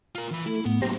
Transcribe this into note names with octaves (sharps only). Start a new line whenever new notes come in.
F4 A#4
E3 B5
A3 E4
A2 B3
F#3 A#3 G4 C5 A#5